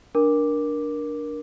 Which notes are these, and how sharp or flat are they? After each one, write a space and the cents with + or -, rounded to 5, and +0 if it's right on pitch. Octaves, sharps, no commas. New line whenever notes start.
D4 +0 A#4 +15 D6 +0